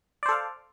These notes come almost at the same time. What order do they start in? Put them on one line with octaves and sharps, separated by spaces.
D5 C5 A4 F5